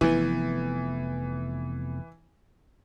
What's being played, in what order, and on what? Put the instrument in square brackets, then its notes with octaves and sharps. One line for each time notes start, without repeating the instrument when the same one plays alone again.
[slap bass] F1 F2 B3 [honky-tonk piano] E3